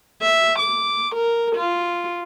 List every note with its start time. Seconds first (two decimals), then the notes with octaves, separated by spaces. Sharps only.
0.22 E5
0.59 D6
1.15 A#4
1.56 F4